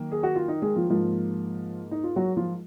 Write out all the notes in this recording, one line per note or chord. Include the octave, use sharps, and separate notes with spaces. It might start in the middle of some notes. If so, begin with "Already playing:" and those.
Already playing: D#3 F#3 A#3
G#4
F#4
F4
D#4
G#3 G#4
F3 F4
G#2 F3 A#3 F4
D#4
F4
F#3 F#4
F3 F4